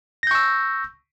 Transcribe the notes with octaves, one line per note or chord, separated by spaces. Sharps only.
C#6 E6 G6 A#6